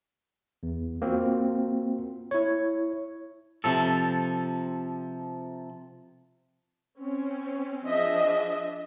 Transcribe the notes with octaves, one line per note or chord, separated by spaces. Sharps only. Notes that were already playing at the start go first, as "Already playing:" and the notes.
E2
A#3 C4 F4 F#4
E4 C#5
C3 F3 A4
C4 C#4
F3 D4 G#4 D#5 E5